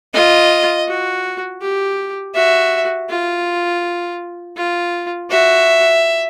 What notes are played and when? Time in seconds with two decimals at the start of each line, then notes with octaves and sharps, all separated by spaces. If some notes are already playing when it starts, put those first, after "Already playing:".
0.13 F4 D#5
0.88 F#4
1.61 G4
2.34 F#4 E5
3.09 F4
4.57 F4
5.30 F#4 E5